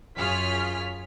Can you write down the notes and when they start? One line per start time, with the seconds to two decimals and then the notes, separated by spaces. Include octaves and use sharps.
0.16 F#2 F4 G#4 C#5 F6 B6